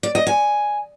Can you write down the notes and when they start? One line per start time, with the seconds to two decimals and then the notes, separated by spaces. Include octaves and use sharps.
0.03 D5
0.15 D#5
0.27 G#5